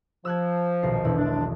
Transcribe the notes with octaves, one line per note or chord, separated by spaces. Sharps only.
F3 E6 F#6 G#6
D#1 B1 C7
E1 E4
F#2 G#3 D4